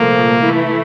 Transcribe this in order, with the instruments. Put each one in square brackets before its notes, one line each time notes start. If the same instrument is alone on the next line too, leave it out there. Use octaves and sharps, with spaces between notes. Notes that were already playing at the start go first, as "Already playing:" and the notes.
Already playing: [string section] C2 A#2 F3 A3 [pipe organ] A#3
[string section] E3 A3 E4